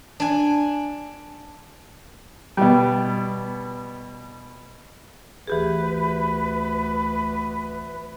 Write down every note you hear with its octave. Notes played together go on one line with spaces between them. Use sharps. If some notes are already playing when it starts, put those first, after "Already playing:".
D4 G#5
B2 G3
D2 E3 G4 G#4 B4